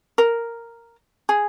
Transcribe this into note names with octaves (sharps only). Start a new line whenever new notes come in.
A#4
G#4